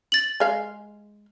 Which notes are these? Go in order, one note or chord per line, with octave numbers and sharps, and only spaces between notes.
A6 F#7
G#3 F5